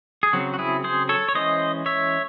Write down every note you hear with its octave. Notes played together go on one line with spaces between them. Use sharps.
G#4
C#3 F#3 C4 F#4
F#4
E4 G#4
G#4 C5
A4 C#5
C#5
E3 G#3 C#4 C5 D#5
C#5 E5